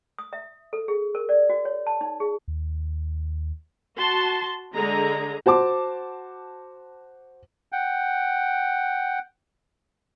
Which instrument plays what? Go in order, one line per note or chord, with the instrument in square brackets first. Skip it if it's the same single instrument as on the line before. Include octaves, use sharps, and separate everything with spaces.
[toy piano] D#6
E5
A4
G#4
A#4
D5
F#4
C#5
A5
D#4
G#4
[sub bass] D#2
[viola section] F#4 A5 C6
D3 G#3 G#4 A#5
[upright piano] F#4 C5 A5 D6
[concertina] F#5 G5